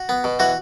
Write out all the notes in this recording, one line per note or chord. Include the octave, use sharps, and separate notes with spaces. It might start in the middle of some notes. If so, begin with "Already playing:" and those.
Already playing: F#4
B3
B2
E3 F#4